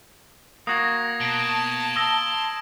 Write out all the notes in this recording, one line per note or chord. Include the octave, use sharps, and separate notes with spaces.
A#3 F#4 D#6 G#6 A#6
B2 A5 A#6 D7
C6 D#6 E6 A#6